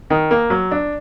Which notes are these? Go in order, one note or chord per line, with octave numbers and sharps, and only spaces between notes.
D#3
A#3
F#3
D4